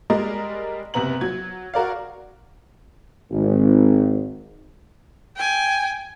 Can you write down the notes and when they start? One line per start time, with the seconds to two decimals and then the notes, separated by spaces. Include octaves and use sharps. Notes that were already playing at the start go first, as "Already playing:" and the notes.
0.10 G3 G#3 A#4 D5 D#5
0.94 F#1 C3 B3 A#5 F#7
1.21 F#3 G#6
1.74 F#4 A#4 D5 F5
3.31 G#1
5.36 G5 G#5